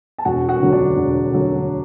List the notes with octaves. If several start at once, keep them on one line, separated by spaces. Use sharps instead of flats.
A5
E1 F#4 F#5
F#4 F#5
D2 D3 F#3
D4 D5
E1
D2 D3 F#3